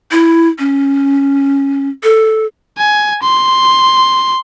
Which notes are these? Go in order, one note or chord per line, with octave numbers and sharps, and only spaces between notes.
E4
C#4
A4
G#5
C6